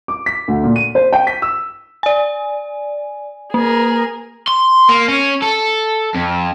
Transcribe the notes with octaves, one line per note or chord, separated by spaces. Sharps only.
D6
B6
D2
A#2
D#7
C5
G5
B6
E6
D5 G#5
A#3 G#4 A#4
C6
A#3
C#4
A4
F2